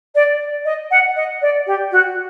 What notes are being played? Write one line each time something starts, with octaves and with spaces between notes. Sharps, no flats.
D5
D#5
F#5
D#5
D5
G4
F#4